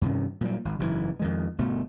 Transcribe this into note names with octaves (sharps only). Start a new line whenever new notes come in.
G2 C3 D#3 C#4
A#2 F#3 G3
G#1
F#1 G#2 C#3 E3
F2 D#3 G#3
G1 B2 A3